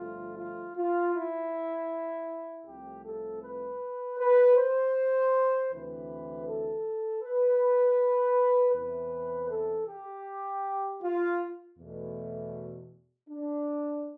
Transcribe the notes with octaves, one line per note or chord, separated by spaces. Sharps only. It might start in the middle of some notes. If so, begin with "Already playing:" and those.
Already playing: G1 G2 F3 A3 F4
F4
F4
E4
C2 C3 F3 A3 G4
A4
B4
B4
C5
D2 C3 E3 B4
A4
B4
E2 C3 E3 B4
A4
G4
F4
E2 B2 A3
D4